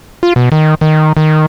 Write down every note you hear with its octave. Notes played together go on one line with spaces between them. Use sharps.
F4
B2
D#3
D#3
D#3